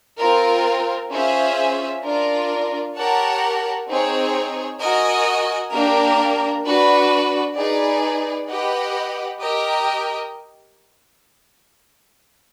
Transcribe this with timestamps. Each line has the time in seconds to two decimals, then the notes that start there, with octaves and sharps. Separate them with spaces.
0.19 C4 F4 A#4
1.11 C#4 F4 G#4 C5 E5
2.03 D4 F4 A#4
2.95 G4 A#4 C#5 F#5 A5
3.89 C4 D#4 G#4 C#5
4.81 F#4 A#4 D#5 G#5
5.72 A#3 D4 G4 A#4
6.64 D4 F#4 B4
7.56 D#4 G#4 B4 D5
8.49 G4 B4 D#5 F#5
9.41 G4 A#4 D#5 G5